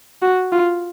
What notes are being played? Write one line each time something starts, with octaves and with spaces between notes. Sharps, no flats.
F#4
F4